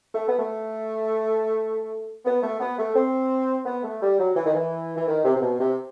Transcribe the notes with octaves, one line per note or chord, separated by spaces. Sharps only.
A3
B3
A3
B3
A3
B3
A3
C4
B3
A3
G3
F#3
E3
D#3
E3
E3
D#3
C3
C3
B2
C3